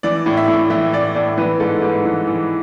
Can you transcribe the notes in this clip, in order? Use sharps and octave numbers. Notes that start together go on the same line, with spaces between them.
E3 D5
A2
E5
A2
E3 E5
E3 D5
A2 D5
E3 B4
G#2 A4
G#2 B4
E3
E3